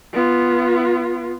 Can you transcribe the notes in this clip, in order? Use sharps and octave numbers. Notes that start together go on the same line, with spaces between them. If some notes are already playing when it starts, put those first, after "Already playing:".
B3 F4